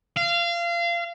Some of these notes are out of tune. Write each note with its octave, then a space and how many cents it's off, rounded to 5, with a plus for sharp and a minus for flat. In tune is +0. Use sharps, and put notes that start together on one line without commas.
F5 -25